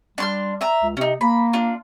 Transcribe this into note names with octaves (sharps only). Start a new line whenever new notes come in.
G3 D4 C6 F6
E5 A#5
C#2
C3 C#4 D#4
A#3 B5
D4 F4